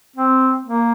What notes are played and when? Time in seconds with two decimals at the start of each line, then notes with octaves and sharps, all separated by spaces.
0.16 C4
0.65 A#3